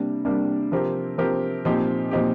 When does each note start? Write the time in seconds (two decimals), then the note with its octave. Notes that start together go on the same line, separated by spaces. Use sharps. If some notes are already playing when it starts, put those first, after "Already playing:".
Already playing: C3 G3 A#3 D4
0.25 C3 G3 A#3 D4
0.72 C3 F3 C4 G4 A#4
1.18 C3 F3 C4 G4 A#4
1.65 A#2 F3 C4 D#4 G4
2.11 A#2 F3 C4 D#4 G4